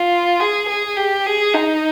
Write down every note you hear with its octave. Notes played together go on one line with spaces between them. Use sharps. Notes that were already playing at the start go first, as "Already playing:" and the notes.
Already playing: F4
G#4
G#4
G4
G#4
D#4